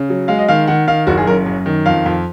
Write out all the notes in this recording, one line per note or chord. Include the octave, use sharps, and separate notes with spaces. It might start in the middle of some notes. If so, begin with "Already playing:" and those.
Already playing: C#3
F#3
G#3 F5
D#5
D#3 F5
D#3 F#5
D#3 F5
F#1 F#4
G#4
F#2 A#4
F#2
D#3
F2 F5
F2